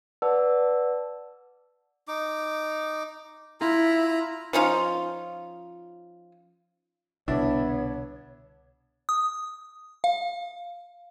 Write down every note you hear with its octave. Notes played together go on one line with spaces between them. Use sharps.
B4 D5 F#5 A5 E6
D#4 D6
E4 F4 A#5
F3 C#4 D#4 F4
C2 B2 D3 B3 D4 E4 C#5
D#6
F5